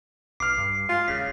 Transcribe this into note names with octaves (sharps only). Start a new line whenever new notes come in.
B1 D6 F6 C7
G2
G#3 F4
D#1 C#3 B6